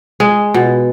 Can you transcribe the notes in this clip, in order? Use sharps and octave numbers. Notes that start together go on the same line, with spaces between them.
G#3
B2